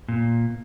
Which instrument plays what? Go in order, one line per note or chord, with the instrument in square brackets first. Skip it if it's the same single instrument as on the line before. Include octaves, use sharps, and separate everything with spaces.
[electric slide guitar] A#2